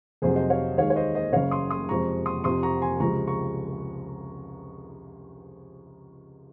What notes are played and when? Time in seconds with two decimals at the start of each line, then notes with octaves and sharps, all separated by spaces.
0.22 F1 F2 C3 F#3 G#4 C5
0.36 C5 D#5
0.50 C#5 F5
0.77 D#2 D#3 G#3 C#5 F5
0.90 C#5
0.96 C5 D#5
1.14 C5 D#5
1.33 F#1 F#2 C#3 C#5 F5
1.51 C6 D#6
1.70 C6 D#6
1.89 F2 C3 F3 G#3 A#5 C#6
2.26 C6 D#6
2.44 F2 C3 F3 C6 D#6
2.63 A#5 C#6
2.82 G#5 C6
3.00 C#2 C3 F3 G#3 A#5 C#6
3.27 A#5 C#6